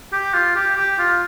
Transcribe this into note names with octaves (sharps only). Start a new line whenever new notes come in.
G4
F4
G4
G4
F4